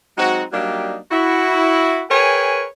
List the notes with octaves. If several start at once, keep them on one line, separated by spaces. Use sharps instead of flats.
F#3 G#3 C4 D#4 F#4
F#3 G3 A#3 D4 D#4 G4
E4 F#4
G#4 A#4 B4 C#5 G5 G#5